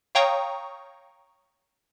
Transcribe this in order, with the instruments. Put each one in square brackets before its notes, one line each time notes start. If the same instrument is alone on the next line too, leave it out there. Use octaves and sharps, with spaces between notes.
[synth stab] C#5 F5 G5 A#5 C#6 D#6